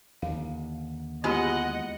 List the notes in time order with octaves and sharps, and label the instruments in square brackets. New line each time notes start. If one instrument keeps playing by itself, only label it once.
[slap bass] D#2 D3 [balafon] F5
[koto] G#3 E4 [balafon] B3 F4 G4 [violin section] D#5 F#5